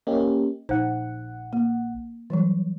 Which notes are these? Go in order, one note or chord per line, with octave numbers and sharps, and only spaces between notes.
A#3 C#4 G4 D#5
A#1 D#4 C5 F#5
A#3
E3 F#3 G3